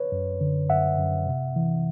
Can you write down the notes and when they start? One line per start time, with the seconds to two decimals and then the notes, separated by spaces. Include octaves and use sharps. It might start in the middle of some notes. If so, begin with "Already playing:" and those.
Already playing: B4 C#5
0.12 F#2
0.41 D3
0.69 F#2 E5 F#5
0.98 F#2
1.27 C3
1.56 E3